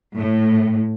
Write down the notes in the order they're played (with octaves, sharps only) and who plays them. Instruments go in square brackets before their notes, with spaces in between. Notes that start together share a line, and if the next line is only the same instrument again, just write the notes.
[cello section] A2